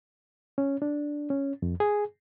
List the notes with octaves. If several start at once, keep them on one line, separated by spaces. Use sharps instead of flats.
C#4
D4
C#4
F2
G#4